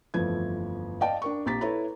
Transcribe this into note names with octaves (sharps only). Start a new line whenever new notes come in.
G1 F2 E3 F3 A3 G#6
D5 D#5 F5 G5 A5
D4 A#4 C#6
A#1 C4 G4 A#5 A6 B6
E4 A4 B4 C#5 A#5 B5